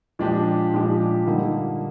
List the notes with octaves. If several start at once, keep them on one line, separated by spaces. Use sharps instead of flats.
A#2 F3 G#3 D4 G4
A#2 F3 G#3 D4 G4
D3 G3 A#3 D#4